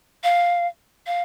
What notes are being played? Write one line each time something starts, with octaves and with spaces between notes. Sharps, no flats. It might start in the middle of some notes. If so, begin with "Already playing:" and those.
F5
F5